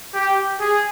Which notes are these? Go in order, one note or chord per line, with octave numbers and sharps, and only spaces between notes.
G4
G#4